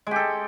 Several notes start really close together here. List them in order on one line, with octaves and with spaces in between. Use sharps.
G#3 G4 A4